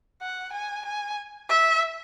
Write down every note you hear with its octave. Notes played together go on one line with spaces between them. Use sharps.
F#5
G#5
G#5
E5